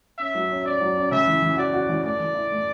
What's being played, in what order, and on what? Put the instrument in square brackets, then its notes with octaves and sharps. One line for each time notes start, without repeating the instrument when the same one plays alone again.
[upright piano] C#4 [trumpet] E5
[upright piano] F#3
C#4
[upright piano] C#4 [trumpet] D5
[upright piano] F#3
C#4
[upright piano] C#3 [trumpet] E5
[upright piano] E3
E3
[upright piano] F#4 [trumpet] D5
[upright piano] F#4
E3
[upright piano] A3 [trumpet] D5
[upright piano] E3
E4
A3